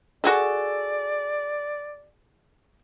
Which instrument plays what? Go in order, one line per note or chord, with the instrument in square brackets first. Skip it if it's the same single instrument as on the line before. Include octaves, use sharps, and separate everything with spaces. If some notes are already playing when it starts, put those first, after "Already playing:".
[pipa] F#4 G#4 A4 [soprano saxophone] D5